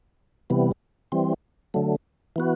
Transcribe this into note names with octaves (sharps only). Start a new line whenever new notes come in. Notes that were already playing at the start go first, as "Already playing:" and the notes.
C3 E3 G3 B3
E3 G3 C4
D3 F#3 A3
E3 B3 F#4